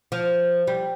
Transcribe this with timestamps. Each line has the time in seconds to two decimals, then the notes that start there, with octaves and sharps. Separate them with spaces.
0.12 F3
0.67 G3